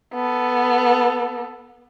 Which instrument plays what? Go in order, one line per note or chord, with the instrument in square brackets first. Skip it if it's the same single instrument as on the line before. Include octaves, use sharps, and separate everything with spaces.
[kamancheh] B3 A4